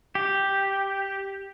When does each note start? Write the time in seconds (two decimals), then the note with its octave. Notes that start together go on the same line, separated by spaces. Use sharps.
0.15 G4